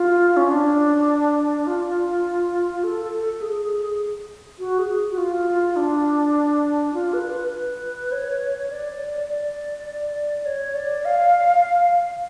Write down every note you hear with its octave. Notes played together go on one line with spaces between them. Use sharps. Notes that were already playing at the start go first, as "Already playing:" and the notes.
Already playing: F4
C#4
D4
F4
A4
G#4
F#4
G#4
F#4
F4
D4
F4
B4
B4
C#5
C#5
D5
D5
C#5
D5
F5